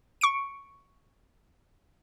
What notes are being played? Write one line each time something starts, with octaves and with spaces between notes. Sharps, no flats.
C#6 C#7 D7